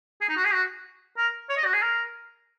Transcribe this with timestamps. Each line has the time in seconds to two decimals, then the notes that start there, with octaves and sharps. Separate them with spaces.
0.21 G#4
0.29 D#4
0.37 F#4
0.45 G#4
0.53 F#4
1.17 A#4
1.49 C#5
1.57 D#5
1.65 F#4
1.73 G#4
1.82 A#4